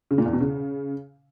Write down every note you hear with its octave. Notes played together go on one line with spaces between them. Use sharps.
C#3
A#2
E2
B2
C#3